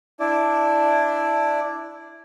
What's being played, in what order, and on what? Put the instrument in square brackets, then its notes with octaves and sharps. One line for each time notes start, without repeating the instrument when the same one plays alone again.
[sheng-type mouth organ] D4 E4 D5